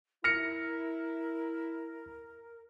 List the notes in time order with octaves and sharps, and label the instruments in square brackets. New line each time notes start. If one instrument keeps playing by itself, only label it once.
[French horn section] E4 [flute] A#4 [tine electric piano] F6 [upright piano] A#6 C#7